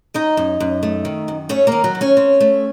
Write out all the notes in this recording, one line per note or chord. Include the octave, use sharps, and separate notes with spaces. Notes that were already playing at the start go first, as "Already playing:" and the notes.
D#3 D#4 D#5
F#2
F#2
A3
D#3
F#2
A3 C#4 C#5
D#3 A#3 A#4
F#3 F#4
D#3
C#4 C#5
C4
A3